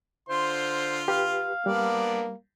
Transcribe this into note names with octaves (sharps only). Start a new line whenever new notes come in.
D3 F4 C5 C6
G4 B4 F5
G3 A#3 B3 D4 D5